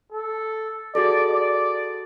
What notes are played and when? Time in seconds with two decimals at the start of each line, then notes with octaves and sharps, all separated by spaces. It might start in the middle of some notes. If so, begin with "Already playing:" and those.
0.13 A4
0.95 F#4 G#4 A4 D5
1.32 D5